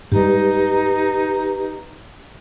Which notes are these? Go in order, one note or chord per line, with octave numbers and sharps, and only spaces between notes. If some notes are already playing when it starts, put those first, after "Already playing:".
G#2 G3 D#4 G4 B4